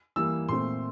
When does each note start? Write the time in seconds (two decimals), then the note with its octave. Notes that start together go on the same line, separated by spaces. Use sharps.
0.16 E3 G3 A#3 E6
0.49 A#2 A3 C4 C6